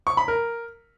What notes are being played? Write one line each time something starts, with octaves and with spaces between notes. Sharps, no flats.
C#6
B5
A#4